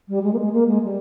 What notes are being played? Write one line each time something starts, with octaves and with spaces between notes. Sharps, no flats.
G3
G#3
A#3
G#3
A#3
G#3
G3